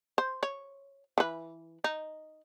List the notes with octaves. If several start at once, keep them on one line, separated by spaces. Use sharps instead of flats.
C5
C#5
E3 B4
D#4